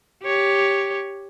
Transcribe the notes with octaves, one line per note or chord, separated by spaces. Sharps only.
G4 C#5